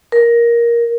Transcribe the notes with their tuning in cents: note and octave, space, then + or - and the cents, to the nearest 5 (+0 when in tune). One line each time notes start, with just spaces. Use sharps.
A#4 +10